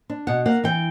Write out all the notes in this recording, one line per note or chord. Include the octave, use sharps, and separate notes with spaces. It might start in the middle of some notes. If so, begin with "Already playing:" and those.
D4
B2 F#5
A#3 F#5
E3 G5